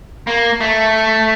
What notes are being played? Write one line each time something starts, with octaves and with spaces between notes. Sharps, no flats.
A#3
A3